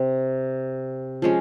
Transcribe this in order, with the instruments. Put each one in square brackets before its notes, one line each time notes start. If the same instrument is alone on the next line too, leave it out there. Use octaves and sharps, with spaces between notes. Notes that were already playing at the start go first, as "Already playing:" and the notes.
Already playing: [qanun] C3 C4
F3 G#3 C#4